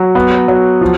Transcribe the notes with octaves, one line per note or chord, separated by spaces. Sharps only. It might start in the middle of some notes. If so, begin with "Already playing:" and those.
Already playing: F#3
B3
F#3
F3